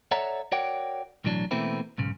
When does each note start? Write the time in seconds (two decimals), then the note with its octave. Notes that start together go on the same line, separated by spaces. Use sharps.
0.11 A4 C#5 D5 E5 F#5 A#5
0.52 F#4 A#4 C#5 D5 F#5 G5
1.24 B1 A2 E3 F#3 D4
1.51 B2 E3 A3 A#3 C4 E4
1.98 B1 G#2 C#3